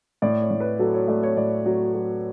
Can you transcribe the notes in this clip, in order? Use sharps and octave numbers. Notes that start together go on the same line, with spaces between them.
A2 D5
C#5
A2
B4
F#3 A4
C#5
A3 D5
C#5
A2 D5
F#3
F#3